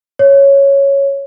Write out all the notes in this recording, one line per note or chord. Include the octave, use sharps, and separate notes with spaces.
C#5